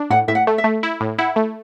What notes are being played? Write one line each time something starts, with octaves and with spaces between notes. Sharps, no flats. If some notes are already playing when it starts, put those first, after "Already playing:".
Already playing: D4
A2 F#5
A2 E5
F#5
A3
E5
A3
E4
A2
E4 F#5
A3